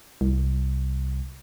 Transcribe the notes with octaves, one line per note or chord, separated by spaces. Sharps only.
C2